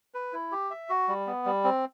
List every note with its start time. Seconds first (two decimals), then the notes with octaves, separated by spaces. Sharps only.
0.14 B4
0.33 E4
0.52 G4
0.70 E5
0.90 F#4
1.08 G3
1.27 B3
1.46 G3
1.64 C4